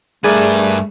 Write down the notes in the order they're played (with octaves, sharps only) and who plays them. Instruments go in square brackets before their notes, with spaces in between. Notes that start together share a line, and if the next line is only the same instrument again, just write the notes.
[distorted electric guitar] G2 B4 [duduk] A3 [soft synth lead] G#4 [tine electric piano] A#4 D5 G#5